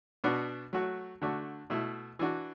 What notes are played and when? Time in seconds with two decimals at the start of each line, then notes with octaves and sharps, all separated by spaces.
0.24 B2 B3 D4 F#4
0.73 F#3 A3 F#4
1.22 D3 A3 D4 F#4
1.70 B2 A3 E4
2.19 E3 D4 F#4